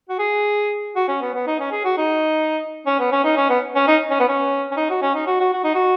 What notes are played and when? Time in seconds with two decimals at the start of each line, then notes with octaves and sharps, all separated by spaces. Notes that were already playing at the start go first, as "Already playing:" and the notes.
0.09 F#4
0.19 G#4
0.96 F#4
1.08 C#4
1.21 B3
1.34 B3
1.47 D#4
1.60 C#4
1.72 G#4
1.84 F#4
1.97 D#4
2.86 C#4
2.99 B3
3.12 C#4
3.24 D#4
3.37 C#4
3.49 B3
3.76 C#4
3.88 D#4
4.11 C#4
4.20 B3
4.29 C#4
4.71 C#4
4.77 D#4
4.90 F#4
5.02 C#4
5.15 D#4
5.27 F#4
5.40 F#4
5.53 F#4
5.64 D#4
5.75 F#4